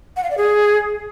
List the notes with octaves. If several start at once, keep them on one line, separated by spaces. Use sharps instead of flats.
F#5
F5
D5
G#4